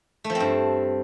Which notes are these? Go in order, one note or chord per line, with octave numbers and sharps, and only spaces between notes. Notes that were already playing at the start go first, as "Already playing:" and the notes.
A3
F3
C4
G2